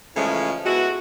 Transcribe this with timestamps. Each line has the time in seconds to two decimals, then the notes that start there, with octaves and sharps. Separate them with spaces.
0.16 C#3 E3 F3 G#3 A3 C#4
0.65 G#3 B3 E4 F#4